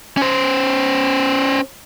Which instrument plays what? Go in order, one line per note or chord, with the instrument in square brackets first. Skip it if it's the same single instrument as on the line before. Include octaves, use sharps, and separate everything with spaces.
[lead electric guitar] C#4 C5